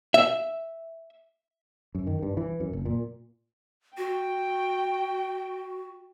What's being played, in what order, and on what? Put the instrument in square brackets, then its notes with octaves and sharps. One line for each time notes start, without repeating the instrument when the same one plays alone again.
[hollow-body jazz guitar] E5
[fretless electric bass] F#2
D#3
G2
E3
F#2
F#1
A#2
[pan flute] F#4 [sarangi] G5